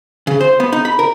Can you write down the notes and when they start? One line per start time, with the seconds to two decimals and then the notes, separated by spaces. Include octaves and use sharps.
0.27 C#3
0.41 C5
0.60 B3
0.73 D#4
0.85 B5
0.99 A#4